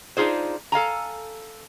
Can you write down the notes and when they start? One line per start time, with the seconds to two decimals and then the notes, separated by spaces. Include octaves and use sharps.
0.17 D4 D#4 F4 G#4 C5
0.72 A4 F5 G#5 A#5